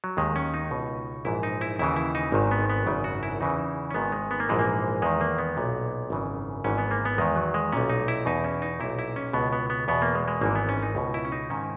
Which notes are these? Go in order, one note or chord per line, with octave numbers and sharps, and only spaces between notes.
F#3
D#2 D#3 G#3
C#4
D#4
C#2 B2
A#1 G#2 E3 E4
D#4
E4
D#2 C#3 E3 E4
E4
D#4
G#1 G#2 D#3
B3
B3
G#1 F#2 C#3
F#4
E4
E2 C#3 E3 D#4
C#4
G#1 G#2 D#3 B3
G#3
B3
A#3
A#1 G#2 E3 G#3
A#3
E2 D#3 G#3
A#3
B3
B1 A#2
G#1 F#2 C#3 E3
G#1 G#2 E3 C#4
B3
A#3
B3
E2 D#3 G#3
F#3
G#3
B1 A#2 C#4
D#4
E4
E2 B2 D#4
C#4
D#4
B1 A#2 E4
E4
C#4
C#2 B2 B3
B3
B3
E2 B2 B3
A#3
G#3
G#3
G#1 G#2 E3 A#3
B3
C#4
D#4
C#2 B2
E4
C#4
D#4
G#2 D#3 C#4